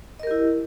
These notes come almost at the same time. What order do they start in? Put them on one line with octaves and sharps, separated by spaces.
D#5 A#4 G4 E4